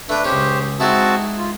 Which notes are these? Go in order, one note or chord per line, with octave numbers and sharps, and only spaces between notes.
A3 D4 B4 G5
C#2 C#4 G4 C5
G#3 C4 D#4 E4 F#4 A5
F4